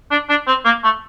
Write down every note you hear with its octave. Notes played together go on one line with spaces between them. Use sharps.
D4
D4
C4
A#3
A3